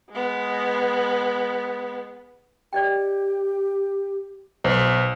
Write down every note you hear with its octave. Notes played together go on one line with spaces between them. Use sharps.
G#3 B3
G4 D5 D#5 G5
B1 B4 C5